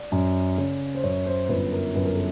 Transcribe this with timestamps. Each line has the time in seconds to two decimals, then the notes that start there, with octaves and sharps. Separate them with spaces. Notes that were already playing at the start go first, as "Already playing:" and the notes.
Already playing: D5
0.12 F#2
0.58 C#3
0.95 C5
1.04 F#2 C#5
1.26 C5
1.49 G1 B4
1.72 A#4
1.95 F#2 B4
2.05 A#4
2.15 A4